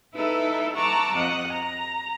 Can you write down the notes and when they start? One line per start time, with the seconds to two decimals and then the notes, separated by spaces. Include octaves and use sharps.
0.14 D#4 E4 A4 B4 E5
0.75 F#5 A5 A#5 C#6 D6 E6
1.14 F2 D#5 F#5
1.52 A#5